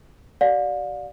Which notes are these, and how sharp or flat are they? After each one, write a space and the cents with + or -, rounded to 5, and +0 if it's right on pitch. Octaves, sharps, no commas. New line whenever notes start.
G4 -45 D5 +0 F5 +40